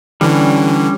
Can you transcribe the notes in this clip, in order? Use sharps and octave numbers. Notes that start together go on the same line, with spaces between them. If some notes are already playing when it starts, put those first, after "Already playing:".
D3 E3 G3 C#4